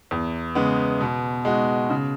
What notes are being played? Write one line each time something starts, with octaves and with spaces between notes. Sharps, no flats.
E2
C#3 G#3 B3
B2
G#3 D#4 F#4
C#3